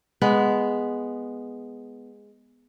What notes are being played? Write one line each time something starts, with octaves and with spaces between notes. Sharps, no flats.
G#3 B3